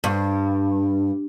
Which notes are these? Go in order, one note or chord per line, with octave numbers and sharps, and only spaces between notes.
G2